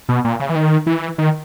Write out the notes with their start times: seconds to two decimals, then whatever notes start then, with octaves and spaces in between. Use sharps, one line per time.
0.09 B2
0.24 A#2
0.40 C#3
0.49 E3
0.56 D#3
0.87 E3
1.18 D#3